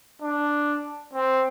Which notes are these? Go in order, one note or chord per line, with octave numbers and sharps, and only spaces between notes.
D4
C4